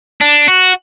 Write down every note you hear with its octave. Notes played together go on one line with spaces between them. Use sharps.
D4
F#4